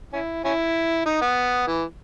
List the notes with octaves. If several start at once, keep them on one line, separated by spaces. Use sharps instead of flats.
C#4 E4
C#4 E4
D#4
B3
E3